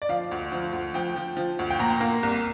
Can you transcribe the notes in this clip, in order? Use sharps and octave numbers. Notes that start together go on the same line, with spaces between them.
D5
F3 F5
D2
F3
D2
F3 G5
F3
F3
D2
G5
A#2 A#5
A#3
C2